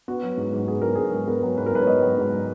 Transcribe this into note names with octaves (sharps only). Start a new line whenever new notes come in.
B3 F#4
F#3
G#2
G#2
B3 G#4
F#3 A#4
G#2 G#4
G#2
B3 A#4
F#3
G#2 B4
A#4
G#2 B4
C#5
B3 D#5
F#3
G#2